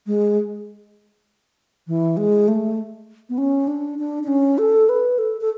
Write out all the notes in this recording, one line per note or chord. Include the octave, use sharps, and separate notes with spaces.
G#3
E3
G#3
A3
B3
C#4
D4
D4
D4
C#4
A4
B4
A4
A4